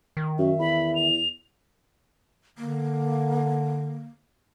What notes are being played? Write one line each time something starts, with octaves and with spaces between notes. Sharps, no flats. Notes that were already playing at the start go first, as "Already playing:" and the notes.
D#3
F#2 E5
E2 B5
F7
D3 A#3